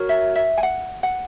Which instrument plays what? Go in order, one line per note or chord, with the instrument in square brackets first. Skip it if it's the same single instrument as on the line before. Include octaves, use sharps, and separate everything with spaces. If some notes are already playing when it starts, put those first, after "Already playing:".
Already playing: [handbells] F#4 A#4 C#5
[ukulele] E5
E5
G#5
F#5
F#5